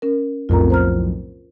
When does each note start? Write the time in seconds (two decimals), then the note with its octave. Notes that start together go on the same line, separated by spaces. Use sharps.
0.02 C#4 A#4
0.49 B1 F2 A2 F4 A#4 A#5
0.70 C5 A#5 F6